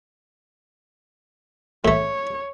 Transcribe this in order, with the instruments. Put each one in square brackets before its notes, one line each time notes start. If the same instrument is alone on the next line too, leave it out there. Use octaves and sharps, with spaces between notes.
[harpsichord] A2 A3 [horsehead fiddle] C#5